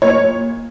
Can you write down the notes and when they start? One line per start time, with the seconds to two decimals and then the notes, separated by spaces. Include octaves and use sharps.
0.02 A#2 C#5